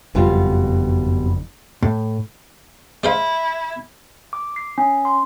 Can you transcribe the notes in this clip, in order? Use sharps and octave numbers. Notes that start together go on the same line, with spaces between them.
F#1 F2 B2 G3 F4
A2
G#3 E4 C5 F5
D6
C7
C#4
C6